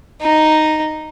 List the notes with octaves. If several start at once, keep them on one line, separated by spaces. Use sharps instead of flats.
D#4